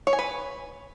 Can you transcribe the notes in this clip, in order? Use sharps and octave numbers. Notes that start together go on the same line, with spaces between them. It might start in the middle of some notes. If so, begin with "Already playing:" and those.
C#5
G#5
B4